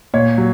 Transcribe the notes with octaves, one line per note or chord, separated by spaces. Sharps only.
A#2 C#5
F#3